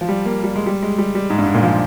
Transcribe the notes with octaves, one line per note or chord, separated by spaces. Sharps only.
F3
G3
A#3
G3
G#3
G3
G#3
G3
G3
G#2
G2
G#2
A#2
F3